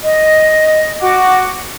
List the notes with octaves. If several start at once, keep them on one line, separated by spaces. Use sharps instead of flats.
D#5
F#4 D6